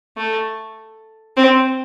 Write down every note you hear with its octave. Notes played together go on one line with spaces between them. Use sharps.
A3
C4